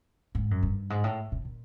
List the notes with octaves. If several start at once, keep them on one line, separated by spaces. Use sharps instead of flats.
G#2
F#2
G2
G#2
A2
A#2
A#2